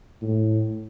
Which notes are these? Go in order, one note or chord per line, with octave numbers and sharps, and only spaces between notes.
A2